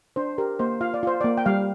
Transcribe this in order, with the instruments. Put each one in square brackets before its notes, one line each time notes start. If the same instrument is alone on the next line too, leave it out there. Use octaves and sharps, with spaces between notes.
[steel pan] D4 C5
G4 A#4
A#3 C5
F4 F5
D5
F4 C5
A#3 D5
G5
G3 F5